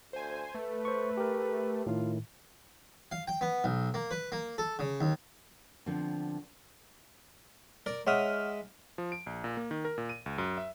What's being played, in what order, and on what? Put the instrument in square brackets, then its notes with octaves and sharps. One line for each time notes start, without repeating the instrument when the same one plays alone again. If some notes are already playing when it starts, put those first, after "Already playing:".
[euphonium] D2 [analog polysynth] C5 G#5
[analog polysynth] A3 [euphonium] B4
[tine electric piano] C5 C#6
G4 A#4
[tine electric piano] A2 D#3 [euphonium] F4
[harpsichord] F5
G5
B3
B1
A#3
B4
A#3
A4
C#3
D#2
[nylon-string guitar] D3 F3 B3 C4
[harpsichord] A#4 D5
[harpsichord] G#3 E5 D#6 [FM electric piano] C#5 F#5 F6
[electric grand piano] F3
D7
A#1
A#2
A#3
D#3
A#4
A#2
D#7
C#2
F#2
E5